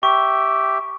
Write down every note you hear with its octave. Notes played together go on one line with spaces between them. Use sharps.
G4 E5 G5 C#6